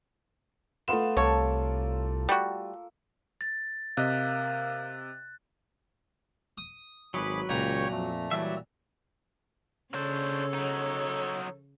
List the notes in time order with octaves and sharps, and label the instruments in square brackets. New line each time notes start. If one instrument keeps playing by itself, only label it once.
[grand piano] A3 C6 E7 [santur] B3 F4 B4
[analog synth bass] C2 [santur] A#3 A4 A#4 [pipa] C#5
[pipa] G3 F#4
[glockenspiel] A6
[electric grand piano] C3 D#5 [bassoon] A#3 [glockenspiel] F#6
[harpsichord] D#6
[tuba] G#1 [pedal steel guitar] F#3 B4 [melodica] G#4 B5 D6
[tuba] C#2 [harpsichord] A#2 A#5 [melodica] C#5 G5 C#6
[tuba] F2 [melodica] A3
[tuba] E3 [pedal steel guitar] F#3 G3 E5
[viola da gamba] C#3 [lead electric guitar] D4 C5 [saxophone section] A4 C#5
[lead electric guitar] F#3 D#4